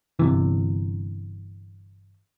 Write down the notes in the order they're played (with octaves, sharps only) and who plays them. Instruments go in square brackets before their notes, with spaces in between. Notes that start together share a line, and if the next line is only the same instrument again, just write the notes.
[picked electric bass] G1 C3 E3